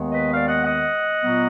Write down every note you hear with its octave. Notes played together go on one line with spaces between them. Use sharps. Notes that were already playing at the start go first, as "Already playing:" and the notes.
Already playing: D#2 D#3 G#3 B3
B4 D#5
D5 F5
D#5 F#5
D#5 F#5
A#2 F#3 B3